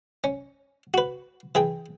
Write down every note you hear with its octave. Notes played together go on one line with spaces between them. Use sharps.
C#4
F#4 B4
E3 G#4 G5